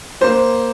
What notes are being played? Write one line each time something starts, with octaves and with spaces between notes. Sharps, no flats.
A#3 C5